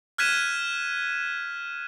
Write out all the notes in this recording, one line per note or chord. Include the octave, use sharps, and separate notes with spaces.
F6 F#6 G#6 B6 D#7 E7